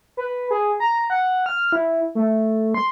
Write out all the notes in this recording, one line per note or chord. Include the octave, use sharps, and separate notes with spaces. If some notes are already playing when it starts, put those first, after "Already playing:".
B4
G#4
A#5
F#5
F6
E4
A3
C6